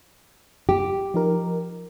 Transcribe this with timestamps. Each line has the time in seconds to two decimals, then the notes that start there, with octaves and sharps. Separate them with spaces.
0.69 G4
1.14 F3 D#4 A#4